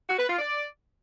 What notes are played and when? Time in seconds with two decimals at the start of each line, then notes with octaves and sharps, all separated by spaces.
0.09 F#4
0.19 B4
0.29 F4
0.39 D5